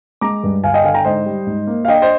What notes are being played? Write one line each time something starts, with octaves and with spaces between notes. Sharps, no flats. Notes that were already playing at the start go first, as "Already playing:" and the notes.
G#3 A#5 D6
G2
G1 F5 G#5
D#5 G5
D3 F5 G#5
G5 A#5
G#2 C5 D#5
G3
G#2
A#3
F5
D4 D#5 G5
C5 D#5